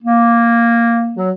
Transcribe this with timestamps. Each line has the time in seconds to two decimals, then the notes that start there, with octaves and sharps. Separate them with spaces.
0.03 A#3
1.16 F#3